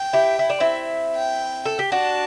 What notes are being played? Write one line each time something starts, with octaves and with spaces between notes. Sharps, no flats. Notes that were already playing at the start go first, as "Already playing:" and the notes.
Already playing: G5
E4 G4
E4
D4
C4 E4
G5
A4
G4
D4 F#4 A5